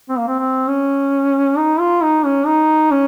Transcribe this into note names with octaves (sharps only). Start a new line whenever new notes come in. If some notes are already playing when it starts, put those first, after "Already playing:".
C4
A#3
C4
C4
C#4
D#4
F4
D#4
C#4
D#4
C#4